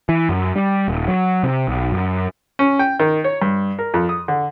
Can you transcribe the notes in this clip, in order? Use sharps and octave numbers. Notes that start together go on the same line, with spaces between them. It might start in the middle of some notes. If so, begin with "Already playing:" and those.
E3
F#2
G3
D#1
F#3
C3
B1
F#2
C#4
G5
D#3
C#5
G2
A#4
F2
D#6
D3